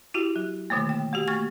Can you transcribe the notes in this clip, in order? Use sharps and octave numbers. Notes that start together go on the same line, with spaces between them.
E4 F#4 G4
F#3
B2 D3 D#3 A3 A#3
G5
G#3 F#4 G4
A3 A#3 C#6 F6 G#6